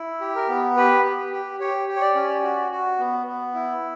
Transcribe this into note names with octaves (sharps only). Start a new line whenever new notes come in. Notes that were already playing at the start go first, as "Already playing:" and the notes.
Already playing: E4
G4
A#4
B3
G4 B4
G4
G4
G4 C#5
G4
C#5
D5
C#4
F#4
F#4
B3
B3
E4